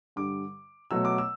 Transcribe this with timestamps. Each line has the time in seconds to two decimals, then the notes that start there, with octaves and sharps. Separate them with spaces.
0.16 G2 D3 G3 D6
0.91 B2 F#3 A3 E6
1.05 D6
1.18 E6